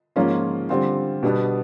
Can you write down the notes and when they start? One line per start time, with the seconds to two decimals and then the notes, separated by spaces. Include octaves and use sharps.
0.16 G#2 F3 A#3 C#4 F4
0.69 D3 G3 C4 F4
1.23 B2 G3 B3 D4